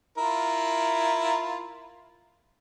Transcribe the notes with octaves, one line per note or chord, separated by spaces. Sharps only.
E4 F4 A#4